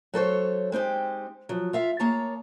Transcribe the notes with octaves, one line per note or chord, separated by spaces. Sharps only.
F#3 A4 C5 C#5
G#3 C4 D#4 G4
F3 F#3
F4 E5 F5
A#3 G#4 C#5 A5 A#5